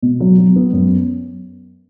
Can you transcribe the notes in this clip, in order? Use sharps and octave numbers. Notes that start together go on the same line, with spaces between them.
B2
F#3
F#3
B3
F#2